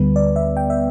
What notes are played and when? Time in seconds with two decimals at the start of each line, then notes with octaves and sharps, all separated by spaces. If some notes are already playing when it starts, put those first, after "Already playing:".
Already playing: D2 D3 G3 B3 B4
0.16 D5
0.36 E5
0.57 G5
0.70 E5